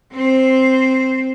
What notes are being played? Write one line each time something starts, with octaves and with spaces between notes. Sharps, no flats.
C4 C5